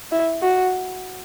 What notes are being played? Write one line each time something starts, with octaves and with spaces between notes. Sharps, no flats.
E4
F#4